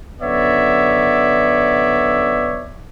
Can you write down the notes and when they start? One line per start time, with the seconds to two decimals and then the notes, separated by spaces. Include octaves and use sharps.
0.21 F#2 D3 B3 C#5 D5 E5